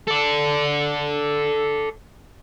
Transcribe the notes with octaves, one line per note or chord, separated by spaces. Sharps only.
A4 D5